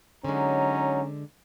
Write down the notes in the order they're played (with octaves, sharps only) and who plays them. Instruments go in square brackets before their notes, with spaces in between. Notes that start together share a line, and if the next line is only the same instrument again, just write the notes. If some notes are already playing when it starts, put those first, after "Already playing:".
[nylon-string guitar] D3 G#3 [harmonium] F#3 D#4 [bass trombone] C#4 [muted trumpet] A#5